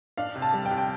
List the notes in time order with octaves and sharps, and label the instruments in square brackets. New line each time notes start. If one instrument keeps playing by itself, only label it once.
[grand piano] D4 [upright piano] F5
[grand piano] C3
[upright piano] A5
[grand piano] G3
[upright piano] G5
[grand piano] C3
[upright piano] G5